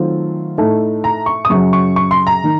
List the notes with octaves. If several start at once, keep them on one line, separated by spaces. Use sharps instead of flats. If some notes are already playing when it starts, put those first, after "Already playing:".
Already playing: D#3 F#3 A3 C4 F4
A2 A3 D#4
A#5
C#6
D#6
F#2 C#3 F#3 C#6
C#6
C#6
C6
A#5
D#3